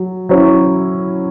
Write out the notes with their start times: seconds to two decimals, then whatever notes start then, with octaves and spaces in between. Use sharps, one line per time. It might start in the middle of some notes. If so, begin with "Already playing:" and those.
Already playing: F#3
0.29 F#3 C#4 E4